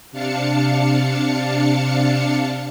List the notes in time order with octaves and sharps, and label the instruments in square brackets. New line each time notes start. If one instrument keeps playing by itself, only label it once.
[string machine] C3 D4 F5 A5 C#7